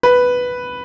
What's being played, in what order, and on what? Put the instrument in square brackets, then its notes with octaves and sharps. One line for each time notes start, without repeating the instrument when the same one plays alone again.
[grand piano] B4